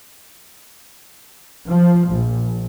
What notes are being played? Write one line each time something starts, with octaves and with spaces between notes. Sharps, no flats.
F3
A#1